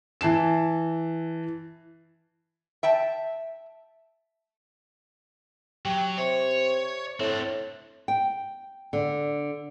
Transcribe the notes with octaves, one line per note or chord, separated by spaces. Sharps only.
E3 A5 C7 E7
E5 G5 A5
F#3 G4
C3 C#5
A2 C4 D4
G5
D3